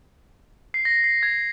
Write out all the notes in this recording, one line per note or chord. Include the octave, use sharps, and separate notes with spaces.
C7
A#6
C7
G#6